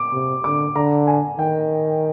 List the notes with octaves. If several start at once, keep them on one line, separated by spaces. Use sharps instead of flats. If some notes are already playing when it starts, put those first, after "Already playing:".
Already playing: D6
C3
D3 D6
D3 A#5
G#5
D#3 G5